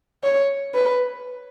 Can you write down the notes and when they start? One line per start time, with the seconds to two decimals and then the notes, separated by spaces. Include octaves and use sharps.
0.23 C#5
0.75 B4